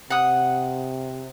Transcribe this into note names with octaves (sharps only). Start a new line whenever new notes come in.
C3 F#5 D#6